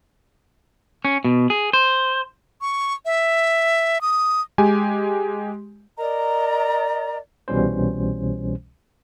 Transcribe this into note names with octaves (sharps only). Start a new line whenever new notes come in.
C#4
B2
G#4
C5
C#6
E5
D#6
G#3 G4 G#5
A#4 D5 D#5 A#5
C2 B2 E3 G3 C#4 C5